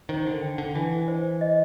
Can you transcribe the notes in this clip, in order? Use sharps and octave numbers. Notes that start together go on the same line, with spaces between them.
D#3 C5
D3
G5
D3
E3 G#5
C5
D#5